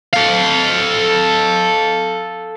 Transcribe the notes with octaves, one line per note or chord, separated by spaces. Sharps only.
A4 F5